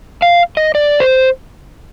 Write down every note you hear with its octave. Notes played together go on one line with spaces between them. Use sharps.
F5
D#5
D5
C5